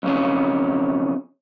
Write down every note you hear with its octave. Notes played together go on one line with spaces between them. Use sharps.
B1 F2 C#3 C#4